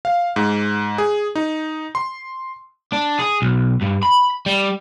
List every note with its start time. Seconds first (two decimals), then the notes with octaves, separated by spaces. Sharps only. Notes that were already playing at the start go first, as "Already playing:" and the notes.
0.05 F5
0.36 G#2
0.98 G#4
1.35 D#4
1.95 C6
2.92 D4
3.19 G#4
3.42 B1
3.82 G2
4.03 B5
4.46 G3